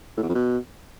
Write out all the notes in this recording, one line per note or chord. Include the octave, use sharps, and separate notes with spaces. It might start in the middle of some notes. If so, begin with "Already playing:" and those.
A2
E2
F2
B2